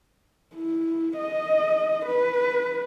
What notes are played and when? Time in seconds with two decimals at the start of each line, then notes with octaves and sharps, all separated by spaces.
0.56 E4
1.18 D#5
2.06 B4